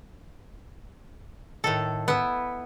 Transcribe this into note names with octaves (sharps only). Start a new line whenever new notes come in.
A2 D#3 A4
B3 E4